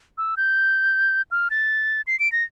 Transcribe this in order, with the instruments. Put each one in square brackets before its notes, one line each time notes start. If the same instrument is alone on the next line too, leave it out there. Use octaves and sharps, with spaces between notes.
[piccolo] E6
G6
F6
A6
C7
D7
A#6